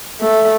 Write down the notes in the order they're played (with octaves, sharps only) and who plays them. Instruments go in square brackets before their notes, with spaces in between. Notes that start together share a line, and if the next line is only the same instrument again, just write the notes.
[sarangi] A3